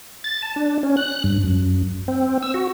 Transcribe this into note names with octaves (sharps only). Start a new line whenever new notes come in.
A6
A5
D4
C#4
F#6
G2
F#2
C4
E6
F#4